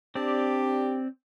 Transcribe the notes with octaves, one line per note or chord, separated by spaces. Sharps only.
C4 D4 G4 D5